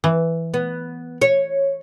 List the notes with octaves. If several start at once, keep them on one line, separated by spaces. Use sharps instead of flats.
E3
B3
C#5